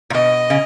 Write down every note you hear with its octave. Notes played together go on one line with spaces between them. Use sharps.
A#2
B2 D#5
C#3